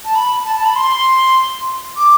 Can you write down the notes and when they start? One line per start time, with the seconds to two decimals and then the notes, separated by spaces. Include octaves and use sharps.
0.05 A5
0.15 B5
0.45 A5
0.56 A5
0.65 B5
0.76 C6
1.97 D6